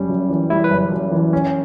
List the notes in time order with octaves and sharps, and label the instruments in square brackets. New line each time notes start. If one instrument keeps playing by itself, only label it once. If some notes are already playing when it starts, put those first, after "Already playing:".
Already playing: [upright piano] F#1 G3 [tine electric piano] C#4
[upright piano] F#2
E3
[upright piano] G3 [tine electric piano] E4
[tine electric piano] B4
[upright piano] F#1
F#2
E3
C#4